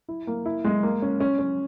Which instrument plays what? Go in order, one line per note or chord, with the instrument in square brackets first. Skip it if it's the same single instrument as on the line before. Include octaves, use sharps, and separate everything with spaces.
[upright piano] E4
A#3
E4
G#3
A#3
C#4
C#4
C#4